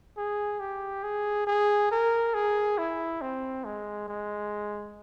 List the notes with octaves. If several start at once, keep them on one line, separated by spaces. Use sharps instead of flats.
G#4
G4
G#4
G#4
A#4
G#4
E4
C4
G#3
G#3